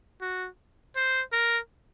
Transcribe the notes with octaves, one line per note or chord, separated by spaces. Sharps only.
F#4
C5
A#4